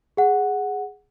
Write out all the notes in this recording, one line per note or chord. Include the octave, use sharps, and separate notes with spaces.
G#4 F#5